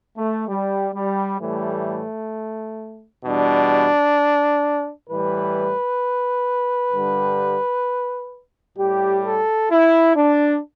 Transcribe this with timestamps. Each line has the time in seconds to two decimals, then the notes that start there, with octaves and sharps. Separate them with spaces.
0.16 A3
0.48 G3
0.94 G3
1.39 A2 E3 G3 A3
3.24 E2 B2 G3 D4
5.09 A2 E3 G3 B4
6.93 G2 D3 G3
8.77 A2 G3 G4
9.24 A4
9.70 E4
10.16 D4